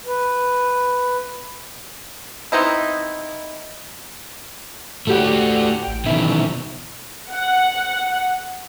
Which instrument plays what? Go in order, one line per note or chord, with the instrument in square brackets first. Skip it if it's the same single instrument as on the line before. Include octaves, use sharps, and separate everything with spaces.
[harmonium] B4
[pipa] B3 C4 D#4 E4
[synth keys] A2 G4 F#5 [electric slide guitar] A3 F#4
[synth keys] A1 G5
[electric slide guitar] B2 D#3 E3 [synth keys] E5
[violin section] F#5